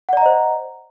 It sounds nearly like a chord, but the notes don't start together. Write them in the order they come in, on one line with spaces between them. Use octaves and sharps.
F#5 D5 A#5 D#5 C5